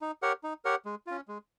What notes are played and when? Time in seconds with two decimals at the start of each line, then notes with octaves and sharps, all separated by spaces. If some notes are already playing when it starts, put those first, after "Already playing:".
0.01 D#4
0.22 G4 A#4 C#5 F#5
0.43 D#4
0.65 G4 A#4 C#5 F#5
0.85 G#3
1.07 C#4 F4
1.28 G#3